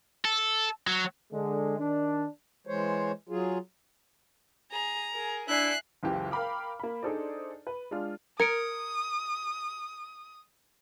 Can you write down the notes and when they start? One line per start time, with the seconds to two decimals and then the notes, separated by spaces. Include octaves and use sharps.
0.25 A4
0.87 F#3
1.33 D3 G#3
1.79 D#3 D4
2.67 E3 G#3 C5 C#5
3.29 F#3 F4 G#4
4.71 G#4 A#5
5.11 G#4 A#4
5.49 D4 E4 E5 G#5 F#6 C7
6.03 F#1 C#2 E3 G4
6.31 A#4 F5 G5 B5 D6 F6
6.80 A#3 B5
7.03 D4 D#4 G#4 A4 C5 D5
7.67 B4
7.91 G#3 D4 F4 F6
8.40 A#4 D#6 G#6 C#7 D7